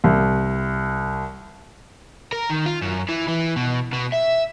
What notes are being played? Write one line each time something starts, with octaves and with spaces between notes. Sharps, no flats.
C2
A#4
D#3
F4
F#2
E3
E3
B2
B2
E5